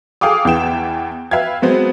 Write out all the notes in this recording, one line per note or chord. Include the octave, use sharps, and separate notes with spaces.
G#4 A4 F5 G5 D6 D#6
E2 E3 G5 E7
B4 E5 F5 G5 G#6
F#3 G#3 B3 C4